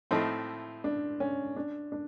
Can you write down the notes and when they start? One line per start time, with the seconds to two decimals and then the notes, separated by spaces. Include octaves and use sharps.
0.11 A2 F3 A3 C4 D#4 E4
0.84 D4
1.20 C#4
1.56 D4
1.92 D4